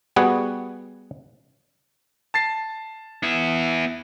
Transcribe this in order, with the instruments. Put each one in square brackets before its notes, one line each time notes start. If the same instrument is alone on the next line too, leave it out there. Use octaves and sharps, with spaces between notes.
[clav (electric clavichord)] G3 B3 F#4 G#4 F#5
[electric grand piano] A5 A6 C7
[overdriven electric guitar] B3 E4